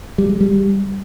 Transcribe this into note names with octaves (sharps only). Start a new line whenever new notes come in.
G3
G#3
G3